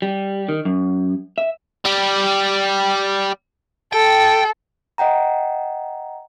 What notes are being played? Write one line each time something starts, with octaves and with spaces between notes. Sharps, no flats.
G3
D#3
F#2
E5
G3 G4
A4 G5
D#5 F#5 G5 A#5